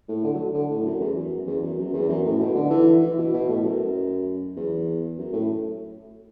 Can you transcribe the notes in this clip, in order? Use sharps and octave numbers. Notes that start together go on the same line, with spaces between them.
A2
D3
F#3
D3
A2
F#2
E2
F#2
E2
F#2
F#2
E2
F#2
A2
B2
D3
E3
E3
B2
B2
A2
F#2
E2
F#2
A2